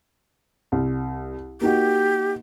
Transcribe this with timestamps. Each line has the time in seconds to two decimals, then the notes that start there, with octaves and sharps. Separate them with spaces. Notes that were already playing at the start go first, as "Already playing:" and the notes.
0.72 C2
1.61 A#3 D#4 F#4 G4